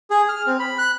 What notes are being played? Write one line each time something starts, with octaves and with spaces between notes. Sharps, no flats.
G#4
F6
C4
B5
F#6